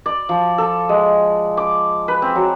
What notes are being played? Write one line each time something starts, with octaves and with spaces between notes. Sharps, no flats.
D5
F3
A4
G#3
D6
B4
C4
F#3